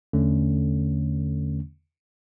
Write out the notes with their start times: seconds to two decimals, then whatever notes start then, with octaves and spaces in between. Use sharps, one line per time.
0.13 E2 D3 A3 C#4